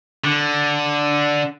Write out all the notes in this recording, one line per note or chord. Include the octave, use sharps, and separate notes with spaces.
D3